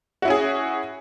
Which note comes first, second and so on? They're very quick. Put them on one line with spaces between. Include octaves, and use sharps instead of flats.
F#4 E4 C#4 G#4